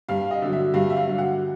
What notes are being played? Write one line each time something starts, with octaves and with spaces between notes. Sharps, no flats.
G2 F5
D#5
D3 F#3
E5
G2 F5
E5
F5
D3 F#3
F#5